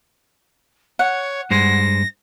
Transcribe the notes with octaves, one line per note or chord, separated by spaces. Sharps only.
C#5 F#5
G2 G#3 C5 A#6